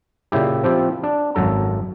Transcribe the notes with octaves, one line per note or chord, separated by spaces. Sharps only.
A#2 C#3 E4 G4
F3 C4 E4 F4 G4
D4
G#1 F#2 F#3 A4 A#5